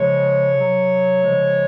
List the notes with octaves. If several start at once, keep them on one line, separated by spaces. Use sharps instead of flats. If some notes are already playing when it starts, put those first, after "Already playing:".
Already playing: C#3 F3 G#3 C#5
C3 F#3
C#3 F3 G#3